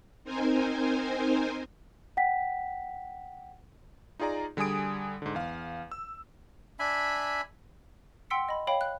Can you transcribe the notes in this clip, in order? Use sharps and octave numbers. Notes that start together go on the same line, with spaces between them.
C4 D#4 A#4 C5 G#5
F#5 G5 B6
D#4 F4 G#4 D5 A#5
D3 G3 G#4 G#5 D#6 D7
G#2 D3
E2 F5
E6
D4 E5 G#5 B5
F#5 G5 C6 E6 B6 C#7
D#5 B5
C#5 F5 G5 B5
F#6